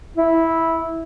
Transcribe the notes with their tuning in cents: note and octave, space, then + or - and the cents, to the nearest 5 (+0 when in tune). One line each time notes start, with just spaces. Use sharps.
E4 -10